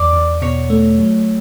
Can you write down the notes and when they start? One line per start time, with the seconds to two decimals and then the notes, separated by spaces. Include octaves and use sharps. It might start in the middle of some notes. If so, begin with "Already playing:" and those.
Already playing: E2 D5
0.13 E2
0.42 B2 C#5
0.70 A3
0.99 F#3